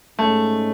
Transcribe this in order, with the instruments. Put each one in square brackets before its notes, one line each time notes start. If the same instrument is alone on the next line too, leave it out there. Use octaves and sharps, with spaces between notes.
[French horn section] G#2 G#3 C#4 [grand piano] A3